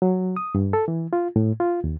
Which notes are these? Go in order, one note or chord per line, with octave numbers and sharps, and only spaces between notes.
F#3
D#6
G2
A4
E3
F4
A2
F4
D#2